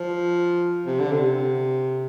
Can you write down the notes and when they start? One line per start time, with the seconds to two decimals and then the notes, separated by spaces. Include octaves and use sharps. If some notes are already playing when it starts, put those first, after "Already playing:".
Already playing: F3
0.86 C3
0.99 D3
1.11 C3